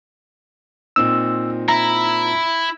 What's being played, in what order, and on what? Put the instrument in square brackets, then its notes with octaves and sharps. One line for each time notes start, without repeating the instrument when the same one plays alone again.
[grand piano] A#2 C4 D#4 [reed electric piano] E6
[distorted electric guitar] E4 [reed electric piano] A#5